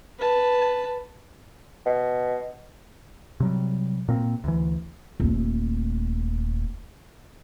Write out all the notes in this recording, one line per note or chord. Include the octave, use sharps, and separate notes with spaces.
B4 A5
B2
C3 F#3 G3
A#2 A#3 C4
D2 E3
D#1 A3